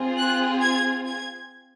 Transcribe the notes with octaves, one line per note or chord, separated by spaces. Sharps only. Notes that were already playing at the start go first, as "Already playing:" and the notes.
Already playing: C4 F4 G#4
F#6
G#6
G#6